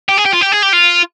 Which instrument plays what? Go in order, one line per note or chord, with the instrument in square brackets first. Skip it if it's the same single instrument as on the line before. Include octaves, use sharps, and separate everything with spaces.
[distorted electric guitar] G4
G#4
G4
F4
G4
G#4
G4
F4